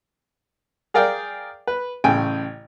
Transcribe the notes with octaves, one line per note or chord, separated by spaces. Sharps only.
G#4 A#4 D5 F5 G5
B4
A1 C#3 G5 G#5